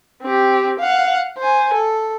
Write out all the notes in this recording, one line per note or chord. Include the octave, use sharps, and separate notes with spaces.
C4 G4
F5 F#5
C5 G#5
A4